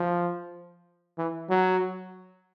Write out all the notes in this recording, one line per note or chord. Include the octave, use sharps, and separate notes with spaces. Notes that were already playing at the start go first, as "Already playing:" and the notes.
Already playing: F3
E3
F#3